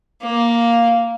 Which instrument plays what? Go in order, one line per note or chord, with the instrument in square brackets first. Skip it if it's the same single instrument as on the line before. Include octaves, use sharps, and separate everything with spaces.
[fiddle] A#3